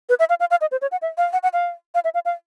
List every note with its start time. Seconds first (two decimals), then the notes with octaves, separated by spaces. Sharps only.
0.09 B4
0.19 E5
0.29 F5
0.40 F5
0.51 F5
0.61 D#5
0.71 C5
0.82 C#5
0.92 F#5
1.02 E5
1.18 F5
1.33 F#5
1.43 F#5
1.53 F5
1.95 F5
2.04 E5
2.14 F5
2.25 F5